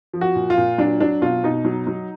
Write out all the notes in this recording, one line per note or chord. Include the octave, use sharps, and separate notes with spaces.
F3
F#4
A#2
F4
A#2
F#3 D4
F#3 D4
B2 F4
B2 D#4
F#3
F#3